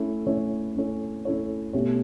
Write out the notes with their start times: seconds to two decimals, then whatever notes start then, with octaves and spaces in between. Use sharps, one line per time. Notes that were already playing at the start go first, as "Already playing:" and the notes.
Already playing: A3 C#4 E4 A4 C#5
0.26 A3 C#4 E4 A4 C#5
0.76 A3 C#4 E4 A4 C#5
1.25 A3 C#4 E4 A4 C#5
1.73 B2 A3 C#4 G4 C#5